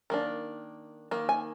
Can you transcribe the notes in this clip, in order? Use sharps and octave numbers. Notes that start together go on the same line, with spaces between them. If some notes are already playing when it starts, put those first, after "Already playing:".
D#3 A#3 D4
D#3 A#3
G#5